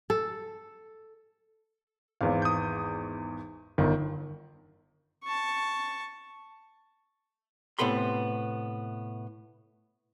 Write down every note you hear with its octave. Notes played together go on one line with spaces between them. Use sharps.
A4
G#1 E2 F5
D#6 G6
G1 D#3
A5 C#6
A2 C3 B3 A4 B5 C6